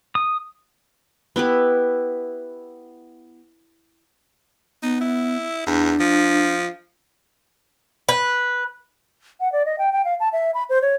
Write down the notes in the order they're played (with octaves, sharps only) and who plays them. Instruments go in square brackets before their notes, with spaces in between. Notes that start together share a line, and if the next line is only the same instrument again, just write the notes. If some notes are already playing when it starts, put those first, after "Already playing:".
[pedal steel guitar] D#6
[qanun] B3 E4 G4 B4
[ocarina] B3 [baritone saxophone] D#4
[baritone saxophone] E4
[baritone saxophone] E2 [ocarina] D4
[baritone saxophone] F3
[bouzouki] B4
[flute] F#5
D5
D#5
G5
G5
F5
A5
E5
B5
C5
C#5